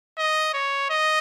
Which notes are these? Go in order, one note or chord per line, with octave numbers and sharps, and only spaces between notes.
D#5
C#5
D#5